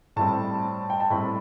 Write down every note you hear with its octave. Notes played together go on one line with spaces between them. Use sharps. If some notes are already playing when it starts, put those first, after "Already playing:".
A2 G3 C4 A5
G5
A5
A2 G3 C4 B5